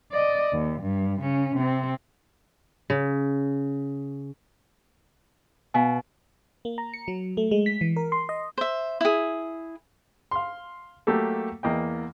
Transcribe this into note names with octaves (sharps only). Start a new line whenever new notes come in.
D5 D#5
D#2
G2
C#3 C#4
C3 C4
C#3
B2 F5 G#5
A#3
A#5
C#7
F#3
A3
G#3
B6
E3
A#4
C6
D#5
C5 E5
E4 G#4
F5 C6
F#3 A3 A#3 G4 A4
E2 A#3 D#5 G5